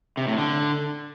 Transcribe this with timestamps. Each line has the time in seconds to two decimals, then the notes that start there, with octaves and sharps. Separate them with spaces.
0.17 C3
0.28 A2
0.38 D3